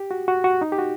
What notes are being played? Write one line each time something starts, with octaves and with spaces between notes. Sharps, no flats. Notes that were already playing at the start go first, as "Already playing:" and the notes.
Already playing: G4
F#4
F#4
F#4
D#4
G4
F#4